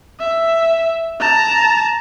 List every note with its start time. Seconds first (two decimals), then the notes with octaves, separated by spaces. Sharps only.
0.19 E5
1.20 A5 A#5